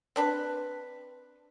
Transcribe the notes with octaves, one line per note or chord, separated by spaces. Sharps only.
C4 D4 B4